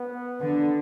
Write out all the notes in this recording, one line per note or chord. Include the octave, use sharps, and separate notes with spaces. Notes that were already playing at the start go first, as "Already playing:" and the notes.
Already playing: B3
D3 B3